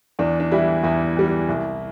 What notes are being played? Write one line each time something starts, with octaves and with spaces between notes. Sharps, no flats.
E2 D4
D4
E3 G3 E4
E2 E4
E3 G3
C2